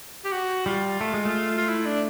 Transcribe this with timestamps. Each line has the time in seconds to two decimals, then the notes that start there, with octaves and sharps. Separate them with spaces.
0.25 G4
0.32 F#4
0.66 G3 F4
1.01 A3
1.14 G#3
1.25 A3
1.57 F4
1.69 E4
1.86 D4